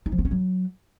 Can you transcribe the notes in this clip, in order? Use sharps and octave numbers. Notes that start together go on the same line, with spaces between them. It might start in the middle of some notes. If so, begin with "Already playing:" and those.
D#4
F3
B3
C#4
F#3